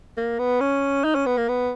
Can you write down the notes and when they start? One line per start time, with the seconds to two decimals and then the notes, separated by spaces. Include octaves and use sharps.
0.17 A#3
0.39 B3
0.60 C#4
1.04 D#4
1.15 C#4
1.26 B3
1.38 A#3
1.48 B3